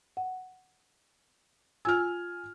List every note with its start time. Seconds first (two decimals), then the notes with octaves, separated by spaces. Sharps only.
0.17 F#5
1.85 F4 G#5 E6 F6